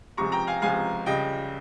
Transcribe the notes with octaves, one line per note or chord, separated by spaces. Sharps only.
C#2 C3 F3 G#3 A#5 C#6
G5 A#5
F5 G#5
C#2 C3 F3 G#3 F5 G#5
C#2 C#3 G3 D#5 G5